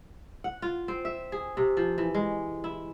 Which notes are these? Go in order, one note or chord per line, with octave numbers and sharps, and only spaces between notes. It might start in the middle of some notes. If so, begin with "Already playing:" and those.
F#5
F4
C4
E5
G#4
C3
F3
E3
G#3
E4